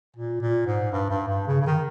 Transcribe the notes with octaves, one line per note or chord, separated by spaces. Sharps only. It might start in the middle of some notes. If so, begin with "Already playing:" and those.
A#2
A#2
G#2
G2
G2
G2
C#3
C#3
D#3